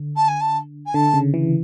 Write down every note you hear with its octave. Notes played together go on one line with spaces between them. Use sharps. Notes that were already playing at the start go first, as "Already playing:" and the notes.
Already playing: D3
A5
G#5
A5
G#5
D3 A5
C#3
E3